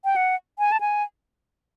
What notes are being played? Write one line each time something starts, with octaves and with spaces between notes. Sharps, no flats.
G5
F#5
G#5
A5
G#5